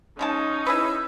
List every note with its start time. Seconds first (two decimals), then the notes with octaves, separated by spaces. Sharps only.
0.19 C#3 G#3 C#4 D#4 A5
0.67 E4 G#4 B4 E6